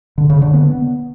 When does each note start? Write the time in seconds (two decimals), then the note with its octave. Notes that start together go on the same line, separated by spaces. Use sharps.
0.18 D3
0.30 C#3
0.42 D3
0.54 B3